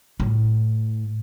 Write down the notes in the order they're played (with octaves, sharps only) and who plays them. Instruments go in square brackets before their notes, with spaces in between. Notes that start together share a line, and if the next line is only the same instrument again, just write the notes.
[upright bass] A2